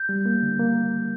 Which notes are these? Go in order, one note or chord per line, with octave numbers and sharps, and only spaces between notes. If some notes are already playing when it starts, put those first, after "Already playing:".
Already playing: G6
G3
A#3
D3
A#3